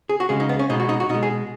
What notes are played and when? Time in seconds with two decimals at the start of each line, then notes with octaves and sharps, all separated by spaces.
0.09 G#4
0.20 F#4
0.29 C#3 G#3 G#4
0.40 D#4
0.49 B3
0.59 C#4
0.70 B2 G#3 D#4
0.80 F#4
0.89 D#4
1.00 F#4
1.09 B2 D#4
1.14 G#3
1.23 G#4